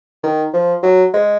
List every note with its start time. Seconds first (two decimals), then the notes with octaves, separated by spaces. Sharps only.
0.23 D#3
0.53 F3
0.83 F#3
1.14 G#3